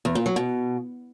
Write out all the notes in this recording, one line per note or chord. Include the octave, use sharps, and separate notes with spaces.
E2
A#2
F#3
B2